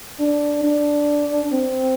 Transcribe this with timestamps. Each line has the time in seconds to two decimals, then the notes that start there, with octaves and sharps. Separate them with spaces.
0.20 D4
0.64 D4
1.53 C4